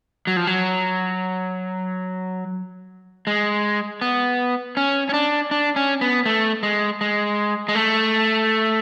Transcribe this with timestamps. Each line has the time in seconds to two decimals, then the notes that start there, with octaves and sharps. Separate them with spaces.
0.27 F#3
0.37 F3
0.47 F#3
3.27 G#3
4.01 B3
4.77 C#4
5.09 C#4
5.14 D4
5.51 D4
5.76 C#4
6.01 B3
6.26 A3
6.63 G#3
7.01 G#3
7.68 G#3
7.75 A3